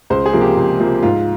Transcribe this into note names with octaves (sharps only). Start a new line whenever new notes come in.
C#2 C5
G#4
C3 F3 A#3
G4
C#2
C3 F3 A#3
G#2 F4